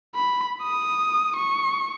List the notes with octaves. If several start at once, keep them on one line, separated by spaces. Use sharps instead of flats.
B5
D#6
C#6